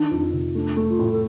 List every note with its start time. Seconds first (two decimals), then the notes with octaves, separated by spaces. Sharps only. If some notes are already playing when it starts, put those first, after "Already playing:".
Already playing: D#3 D4
0.11 F2
0.33 C3
0.55 A3 D4
0.77 A3
0.89 F4
0.99 A2
1.12 A4